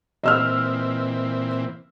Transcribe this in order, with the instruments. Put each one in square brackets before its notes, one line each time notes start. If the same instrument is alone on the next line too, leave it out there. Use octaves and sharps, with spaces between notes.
[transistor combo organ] A#2 E3 C4 [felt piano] D#5 E6 F6